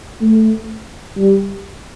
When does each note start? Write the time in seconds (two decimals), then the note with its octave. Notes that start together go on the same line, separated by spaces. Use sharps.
0.21 A3
1.17 G3